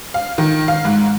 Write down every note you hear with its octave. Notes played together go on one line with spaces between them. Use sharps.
F5
D#3
F5
G#2